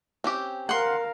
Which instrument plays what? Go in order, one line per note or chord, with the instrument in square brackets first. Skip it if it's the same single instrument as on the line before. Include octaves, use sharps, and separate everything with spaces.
[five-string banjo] C4 C#4 G4
[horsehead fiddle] A#4 F5 [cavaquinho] F#5 C6